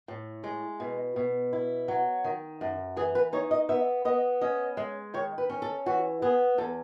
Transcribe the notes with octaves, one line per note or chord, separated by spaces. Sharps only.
A2
G#3
B2
B2
E4
F#3
D#3
F#2
E3 G#4
B4
D#4 C#5
D#5
B3 E5
B3 D#5
C#4 D#5
G#3
D#3 C#5
B4
C#4
A4
E3 F#4
B3 G#4
E2 A4